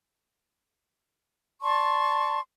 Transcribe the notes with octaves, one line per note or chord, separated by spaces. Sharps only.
D5 A5 C6 C#6